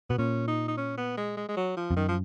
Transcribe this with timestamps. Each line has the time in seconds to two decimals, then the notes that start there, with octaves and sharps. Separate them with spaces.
0.10 B2 B3
0.18 A#2 C#4
0.48 D#4
0.68 D#4
0.77 C#4
0.97 B3
1.17 G#3
1.37 G#3
1.49 G#3
1.57 F#3
1.77 F3
1.91 F2
1.96 F#2 D#3
2.09 F3